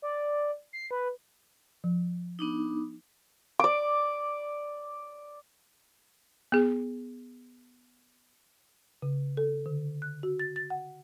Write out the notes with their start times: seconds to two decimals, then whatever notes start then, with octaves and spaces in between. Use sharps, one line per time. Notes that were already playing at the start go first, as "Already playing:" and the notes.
0.02 D5
0.73 C7
0.91 B4
1.84 F3
2.39 B3 D4 D#4
3.60 D5 D6
6.52 B3 G#4
9.02 C#3
9.37 A4
9.66 D3
10.02 F#6
10.23 F#4
10.39 A6
10.56 A6
10.70 F#5